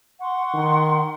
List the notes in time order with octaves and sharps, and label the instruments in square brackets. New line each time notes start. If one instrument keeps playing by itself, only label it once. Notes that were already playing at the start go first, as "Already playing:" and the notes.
[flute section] F#5 C6 C#6
[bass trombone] D#3